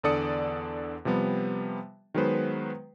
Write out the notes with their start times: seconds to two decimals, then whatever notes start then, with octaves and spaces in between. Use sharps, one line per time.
0.03 E2 D3 A4 D5 D#6 C#7
1.05 C3 F3 G3 B3
2.14 D#3 F#3 G#3 B3 B4 C5